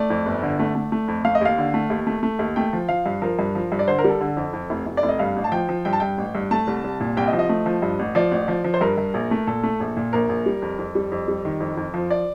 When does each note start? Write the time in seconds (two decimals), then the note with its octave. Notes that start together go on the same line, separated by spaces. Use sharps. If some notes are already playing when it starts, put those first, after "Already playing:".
Already playing: A3 D5
0.10 F2
0.26 G1
0.43 D3
0.59 A3
0.75 A3
0.92 A3
1.08 F2
1.25 A3 F5
1.35 D#5
1.41 D#2 F5
1.58 D3
1.74 A3
1.90 D#2
2.07 A3
2.23 A3
2.39 D#2
2.56 A3 G5
2.73 F3
2.89 F3 F5
3.06 G2
3.22 F3 A#4
3.39 G2
3.55 F3
3.72 G2
3.79 D5
3.88 D3 C5
3.99 A#4
4.04 G3
4.10 A4
4.21 D3
4.37 F2
4.53 F2
4.70 F1
4.86 F1
4.97 D5
5.03 F1
5.09 D#5
5.19 G2 F5
5.36 A1
5.44 A5
5.52 F3 G5
5.69 F3
5.85 G2 G5
5.93 A5
6.00 G2 G5
6.18 A1
6.35 G2
6.51 A3 A5
6.67 C2
6.84 C2
7.00 A#2
7.17 C2 G5
7.28 D#5
7.33 F3
7.39 D#5
7.49 A3
7.66 F3
7.82 G2
7.99 A1
8.15 F3 D5
8.32 A1
8.48 F3
8.64 F3
8.74 C5
8.81 G2 A#4
8.98 G2
9.14 A#1
9.31 A3
9.47 A#2 A4
9.63 A3
9.80 A#1
9.97 A#2
10.13 A#1 A#4
10.29 A#1
10.46 G3
10.62 F2
10.78 F2
10.95 G3
11.12 F2
11.28 G3
11.45 D#3
11.60 F2
11.77 F2
11.94 F3
12.11 D5